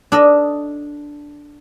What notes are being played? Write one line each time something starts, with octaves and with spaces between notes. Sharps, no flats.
D4 A4 D#5